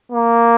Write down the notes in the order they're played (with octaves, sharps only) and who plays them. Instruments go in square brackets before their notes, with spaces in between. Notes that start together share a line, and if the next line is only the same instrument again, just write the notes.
[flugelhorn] A#3